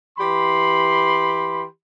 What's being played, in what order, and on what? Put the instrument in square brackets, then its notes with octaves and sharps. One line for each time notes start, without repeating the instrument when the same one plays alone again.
[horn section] E3 G4 B5 C6